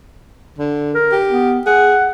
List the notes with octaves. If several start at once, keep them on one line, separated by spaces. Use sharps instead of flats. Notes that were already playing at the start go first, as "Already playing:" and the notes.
D3
A#4
G4
B3
G#4 F#5